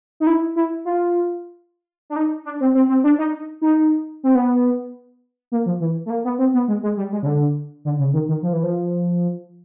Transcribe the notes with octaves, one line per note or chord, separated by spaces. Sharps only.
D#4
E4
E4
F4
D4
D#4
D4
C4
C4
C4
D4
D#4
D#4
C4
B3
A#3
F3
E3
A3
A#3
B3
C4
B3
G#3
G#3
G3
G#3
C#3
D3
D3
C#3
D#3
D#3
F3
E3
F3